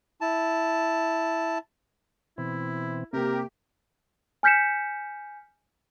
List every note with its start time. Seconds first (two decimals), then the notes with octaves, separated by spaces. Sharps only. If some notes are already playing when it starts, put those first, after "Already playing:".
0.21 E4 A5
2.38 B2 E3 C4 E4
3.13 C3 A#3 G4 A#4
4.43 G#5 F6 G6 B6 C#7 E7